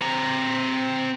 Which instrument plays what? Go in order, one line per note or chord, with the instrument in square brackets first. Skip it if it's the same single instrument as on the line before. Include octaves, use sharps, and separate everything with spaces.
[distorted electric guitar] C4 A#5